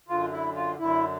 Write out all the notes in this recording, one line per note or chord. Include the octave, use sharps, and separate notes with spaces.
F#2 D3 F4
E4
F4
F#2 D3 E4